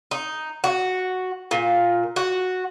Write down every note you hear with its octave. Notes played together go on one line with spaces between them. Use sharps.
D#4
F#4
A#2
F#4